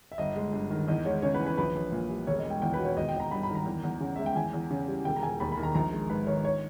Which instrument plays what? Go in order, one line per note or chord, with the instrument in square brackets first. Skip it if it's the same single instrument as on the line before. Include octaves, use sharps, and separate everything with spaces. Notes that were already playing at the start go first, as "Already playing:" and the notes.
[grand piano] E5
G1 D#5
G#3
G2
D#3
E2 D#5
G#3 C#5
C#3 C#5
B4
E3
B4
A#1 B4
A#1
A#2
G3
E1 C#5
D#5
G#3
G5
E2 G5
B4
B2
C#5
G#1 D#5
G5
G#1
A#5
G2 B5
B5
D#3
A#5
E2
E2
C#3
G#3 E5
G5
E2 G#5
E2
C#3
G3
E1 G5
A#5
E1 G#5
D#2 B5
B5
D#3
A#5
A#1 A#5
G#3
G#2 B4
D#3 C#5
C#5